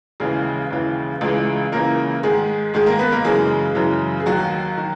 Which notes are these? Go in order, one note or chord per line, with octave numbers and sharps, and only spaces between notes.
D#2 C#3 E3 G#3 G#4
D#2 C#3 E3
C#2 C#3 E3 G#3 G#4
C#2 C#3 E3 A#3 A#4
G#2 D#3 G#3 G#4
G#2 D#3 G#3 G#4
A#3 A#4
B3 B4
A#3 A#4
F#2 C#3 E3 G#3 G#4
F#2 C#3 E3
G#4
D#2 D#3 F#3 F#4
D#3